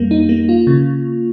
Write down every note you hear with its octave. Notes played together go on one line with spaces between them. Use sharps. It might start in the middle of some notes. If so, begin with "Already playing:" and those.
Already playing: F2 G3 A#3
D#4
A#3
F4
C#3